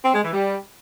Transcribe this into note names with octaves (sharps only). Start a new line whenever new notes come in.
C4
G#3
E3
G3